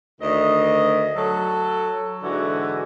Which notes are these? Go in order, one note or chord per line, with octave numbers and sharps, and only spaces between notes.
D2 D#3 D#5
F#3 A4
G#2 D3 E3 F#4